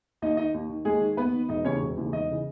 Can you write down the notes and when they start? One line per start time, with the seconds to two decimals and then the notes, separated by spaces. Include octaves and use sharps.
0.22 D#2 D#4 D#5
0.37 D#3 D#4 D#5
0.54 D#2
0.69 D#3
0.85 D#2 G#3 G#4
1.01 D#3
1.17 D#2 B3 B4
1.34 D#3
1.49 E1 D#4 D#5
1.65 D#2 C#3 E3 C#4 C#5
1.81 E1
1.97 D#2 C#3 E3
2.12 E1 D#4 D#5
2.30 C#3 E3